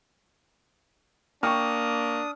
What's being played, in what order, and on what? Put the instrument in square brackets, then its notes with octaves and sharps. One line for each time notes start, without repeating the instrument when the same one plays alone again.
[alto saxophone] A#3 [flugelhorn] D4 [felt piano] G5 C#6 F6 [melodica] D#6